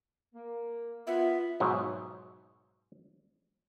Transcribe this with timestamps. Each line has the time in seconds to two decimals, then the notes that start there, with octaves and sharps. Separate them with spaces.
0.34 A#3
1.07 B3 F4 E5
1.60 G#2 B2 F#3